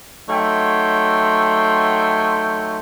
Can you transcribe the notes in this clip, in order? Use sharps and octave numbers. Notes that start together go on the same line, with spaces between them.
F#3 A3 D#4 E5 G5 C6